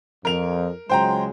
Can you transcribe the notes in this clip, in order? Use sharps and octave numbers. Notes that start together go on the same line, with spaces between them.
F2 A#4 F7
C#2 F#3 G#3 C5 G5 A#5